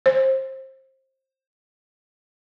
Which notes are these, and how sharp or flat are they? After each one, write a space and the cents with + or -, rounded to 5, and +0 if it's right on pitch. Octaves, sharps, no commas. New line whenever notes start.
C5 +25